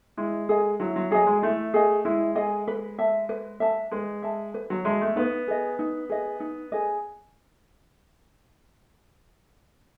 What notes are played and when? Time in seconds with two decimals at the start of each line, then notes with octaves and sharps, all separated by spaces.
0.17 G#3 E4
0.49 G#4 D#5
0.80 F#3 E4
0.96 F#3
1.11 F#3 G#4 D#5
1.27 G#3
1.42 A3 E4
1.74 G#4 D#5
2.05 G#3 E4
2.36 G#4 D#5
2.68 B4
2.99 E5 A5
3.29 B4
3.60 E5 A5
3.91 G#3 B4
4.23 E5 A5
4.54 B4
4.70 F#3
4.85 G#3 E5 A5
5.01 A3
5.16 B3 D#4
5.48 G#4 D#5
5.79 D#4
6.09 G#4 D#5
6.40 D#4
6.72 G#4 D#5